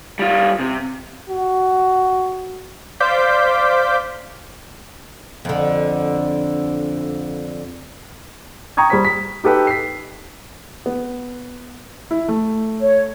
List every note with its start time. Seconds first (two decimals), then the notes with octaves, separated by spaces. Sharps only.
0.19 G3 F4
0.60 C3
1.29 F#4
3.00 C5 D5 F5 D6 G6 B6
5.45 F2 D3
8.77 G5 A#5 C#6 D#6 G#6
8.90 G3 C5 B6
9.05 B6
9.44 D#4 G4 A4 B4 G5
9.67 B6 C7
10.86 B3
12.11 E4
12.29 A3
12.81 C#5